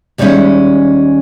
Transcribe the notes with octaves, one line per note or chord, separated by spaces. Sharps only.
D#2 G3 G#3 C4 C#4 E5